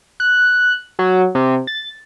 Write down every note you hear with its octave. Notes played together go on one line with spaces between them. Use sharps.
F#6
F#3
C3
A6